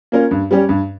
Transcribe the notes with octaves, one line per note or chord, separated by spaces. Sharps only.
A#3 C#4 F4 A#4
G2
G3 C#4 G4
G2